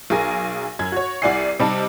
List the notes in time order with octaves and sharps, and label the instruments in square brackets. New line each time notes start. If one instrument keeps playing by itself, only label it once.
[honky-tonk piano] B1 G#4 A#4 G#5 A#6
F#2 G#6
F#4 C#5
C2 E4 D5 F#5 G#5 C7
C3 G3 D#4 A5